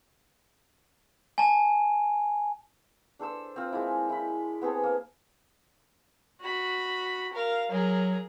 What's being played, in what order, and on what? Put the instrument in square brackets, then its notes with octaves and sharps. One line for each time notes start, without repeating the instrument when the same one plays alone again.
[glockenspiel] G#5 A5
[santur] D4 A4 C5 E6
C4 F4
G#3 A#3 E4
E4 B5
B3 C4 G#4 A4
A#3
[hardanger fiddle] F#4 B5
A#4 F5
[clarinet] F#3 [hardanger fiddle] G#4 A#4